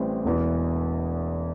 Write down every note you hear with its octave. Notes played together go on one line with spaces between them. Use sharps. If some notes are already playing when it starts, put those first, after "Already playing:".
Already playing: A1 A2 E3 G3 C4
E1 E2 E3